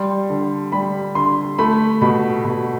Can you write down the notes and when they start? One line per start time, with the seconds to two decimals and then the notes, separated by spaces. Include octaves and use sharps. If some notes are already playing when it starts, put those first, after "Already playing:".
Already playing: G3 C6
0.30 D3
0.72 G3 B5
1.15 D3 C6
1.59 A3 B5
2.02 B2 B5
2.44 B2